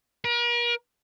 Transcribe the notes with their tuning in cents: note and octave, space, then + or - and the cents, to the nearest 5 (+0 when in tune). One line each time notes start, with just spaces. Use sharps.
A#4 +40